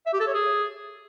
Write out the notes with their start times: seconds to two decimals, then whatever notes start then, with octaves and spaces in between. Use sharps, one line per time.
0.07 E5
0.13 G4
0.20 A4
0.27 C#5
0.34 G#4